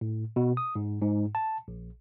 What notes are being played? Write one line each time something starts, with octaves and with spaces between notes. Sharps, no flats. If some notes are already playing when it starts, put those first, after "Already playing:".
A2
B2
D#6
G#2
G#2
A5
A#1